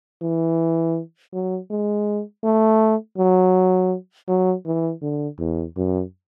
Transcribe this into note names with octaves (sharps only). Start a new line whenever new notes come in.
E3
F#3
G#3
A3
F#3
F#3
E3
D3
E2
F#2